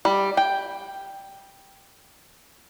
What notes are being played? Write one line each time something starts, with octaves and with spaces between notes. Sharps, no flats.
G3
G5